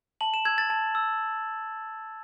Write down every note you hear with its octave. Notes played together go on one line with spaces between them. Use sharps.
A5 F#7
E7
E6 G#6
A6
A5 A6
E6